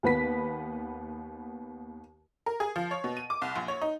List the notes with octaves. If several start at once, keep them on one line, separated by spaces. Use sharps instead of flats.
D#2 B3 B4 B6
A#4
G#4
F3
C#5
B2
D#7
D6
C2
A#1
C#5
D#4